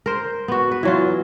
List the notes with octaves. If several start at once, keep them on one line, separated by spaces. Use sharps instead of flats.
A#4 C5
B3 F#4
B4
E3 F#3 F4